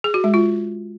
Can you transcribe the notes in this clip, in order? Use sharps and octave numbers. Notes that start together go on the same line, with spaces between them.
G#4
F#4
G#3
F4